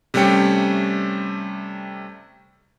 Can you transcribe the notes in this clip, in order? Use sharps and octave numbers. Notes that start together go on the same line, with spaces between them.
C3 G3 A3 C#4 G5 C#7